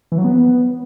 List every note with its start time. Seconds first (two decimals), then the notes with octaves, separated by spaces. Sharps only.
0.12 E3
0.18 F#3
0.24 B3